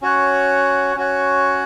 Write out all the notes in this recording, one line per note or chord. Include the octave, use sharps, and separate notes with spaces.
C#4 F#4 C#5 F#5
C#4 F#4 C#5 F#5